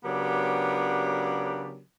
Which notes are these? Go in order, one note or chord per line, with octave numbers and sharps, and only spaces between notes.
C#3 F#3 B3 D4 G4 A#4